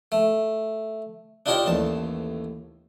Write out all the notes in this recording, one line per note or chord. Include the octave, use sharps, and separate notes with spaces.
A3
D4 D#4 F4 G4 A#4 C#5
A1 D#2 A5